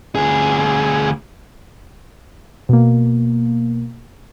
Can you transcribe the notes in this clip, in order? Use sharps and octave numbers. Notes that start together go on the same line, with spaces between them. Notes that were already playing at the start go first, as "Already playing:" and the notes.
D2 G#4
B2 A#3